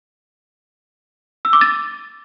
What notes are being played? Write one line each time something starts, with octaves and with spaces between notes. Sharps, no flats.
E6
D6
A6